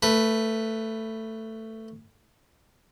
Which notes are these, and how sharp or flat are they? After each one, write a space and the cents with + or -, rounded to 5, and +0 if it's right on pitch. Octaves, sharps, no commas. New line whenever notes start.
A3 +15 B4 +0